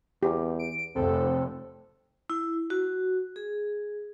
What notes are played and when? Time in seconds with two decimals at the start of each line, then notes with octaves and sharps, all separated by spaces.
0.23 E2 G4
0.59 D7
0.96 F1 C4 A4
2.30 E4
2.70 F#4
3.36 G#4